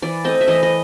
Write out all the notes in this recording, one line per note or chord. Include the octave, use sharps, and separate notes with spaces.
E3 D5
A3 C4 D#5
E5
E3 D#5
D#5